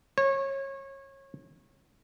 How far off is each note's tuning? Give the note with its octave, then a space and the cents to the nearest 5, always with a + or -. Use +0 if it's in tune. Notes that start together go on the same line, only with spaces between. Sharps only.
C#5 -25